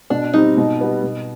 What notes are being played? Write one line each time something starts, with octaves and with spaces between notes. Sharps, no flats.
B2 D4
G3 C4 D#4
B2
G3 B3
B2